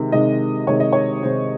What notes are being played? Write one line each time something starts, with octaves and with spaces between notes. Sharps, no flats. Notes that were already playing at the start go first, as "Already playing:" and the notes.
Already playing: C3 D#3 G#3
C3 D#3 G#3 D#5
C3 D#3 G#3 C#5
D#5
C#5
C3 D#3 G#3 C5